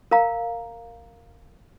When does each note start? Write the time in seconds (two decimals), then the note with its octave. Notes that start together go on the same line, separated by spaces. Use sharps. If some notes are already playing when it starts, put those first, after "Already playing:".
0.11 A#4 F5 A#5